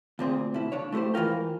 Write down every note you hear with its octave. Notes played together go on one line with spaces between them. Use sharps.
D2 A#2 C4 G#4
B2 E4
C#3 D4 C#5
A3 E4 F4 G4 C5
G#2 E3 G#3 F4 A#4 G5